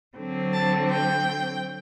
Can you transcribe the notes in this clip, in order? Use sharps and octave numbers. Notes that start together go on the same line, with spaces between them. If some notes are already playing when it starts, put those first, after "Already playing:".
D3 F#3 C4
A5
G5